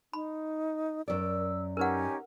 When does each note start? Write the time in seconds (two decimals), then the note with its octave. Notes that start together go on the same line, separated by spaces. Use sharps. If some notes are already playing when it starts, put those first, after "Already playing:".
0.13 D#4 B5
1.08 F#2 A#4 D5 E6
1.77 C#4 D#4 G4 A#4 B4 F#5 G#5